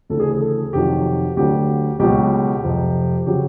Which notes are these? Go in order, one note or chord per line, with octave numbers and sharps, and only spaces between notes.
D2 C#3 E3 A4
G#4
G#4
A4
F2 C3 D#3 F#3 G4
D2 D3 F#3 G4
C#2 B2 F#3 G4
F2 C3 F3
C#3 F#3 G4